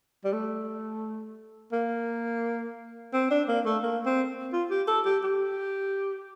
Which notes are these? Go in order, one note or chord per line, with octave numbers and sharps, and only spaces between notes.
G3
A3
A#3
C4
D4
A#3
A3
A#3
C4
F4
G4
A4
G4
G4